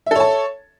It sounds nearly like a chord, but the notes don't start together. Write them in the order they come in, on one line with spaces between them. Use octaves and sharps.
E5 A4 C#5 A5